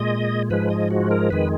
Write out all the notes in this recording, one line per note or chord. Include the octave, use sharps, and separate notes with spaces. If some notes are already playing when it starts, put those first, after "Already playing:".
Already playing: A#2 G#3 D#5
G#2 F3 G#3 B4
D#5
F#4
A#4
F2 D#3 G#3 B4